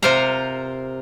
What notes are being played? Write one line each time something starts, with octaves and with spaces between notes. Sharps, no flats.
C3 F4 A#4 C5 F5 A#5